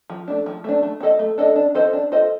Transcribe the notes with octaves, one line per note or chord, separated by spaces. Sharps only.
F3
A3 D4
F3
A3 D4
A3
D4 A4 D#5
A3
D4 A4 D#5
D4
F4 A4 C5 D#5
D4
F4 A4 C5 D#5